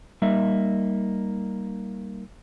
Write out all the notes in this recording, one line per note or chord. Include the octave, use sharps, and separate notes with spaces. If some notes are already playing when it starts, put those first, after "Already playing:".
G3 A#3 D#4 E5